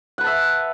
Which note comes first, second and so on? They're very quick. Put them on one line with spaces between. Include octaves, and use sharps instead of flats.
F#5 B4 A5 E5